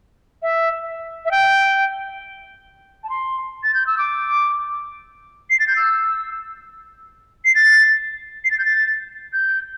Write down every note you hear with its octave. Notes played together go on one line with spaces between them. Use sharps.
E5
E5
G5
A5
C6
A6
G6
E6
D6
C7
A6
G6
E6
C7
A6
C7
A6
G6
A6
G6